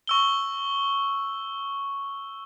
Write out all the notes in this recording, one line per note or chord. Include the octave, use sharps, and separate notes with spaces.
C#6 E6 G7